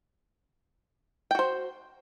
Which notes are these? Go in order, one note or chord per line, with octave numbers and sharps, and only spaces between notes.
F#4 C5 G5